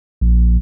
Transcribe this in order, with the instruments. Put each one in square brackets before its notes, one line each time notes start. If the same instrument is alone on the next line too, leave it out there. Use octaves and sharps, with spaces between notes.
[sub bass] A#1